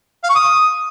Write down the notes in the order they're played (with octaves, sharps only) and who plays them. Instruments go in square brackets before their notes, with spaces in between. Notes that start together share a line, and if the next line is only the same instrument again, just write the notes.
[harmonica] F5
C#6
D#6